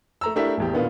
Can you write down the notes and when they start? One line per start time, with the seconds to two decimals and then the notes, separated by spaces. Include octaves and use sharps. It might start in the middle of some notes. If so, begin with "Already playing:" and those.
0.21 A3 A#5 E6
0.36 A3 D4 E4 G4 A#4 E5
0.58 A1 E2 G4
0.73 A#2 D#3 B3 D4 F4